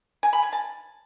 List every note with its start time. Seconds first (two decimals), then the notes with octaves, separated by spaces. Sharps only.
0.23 G#5
0.33 B5
0.43 G#5
0.53 A5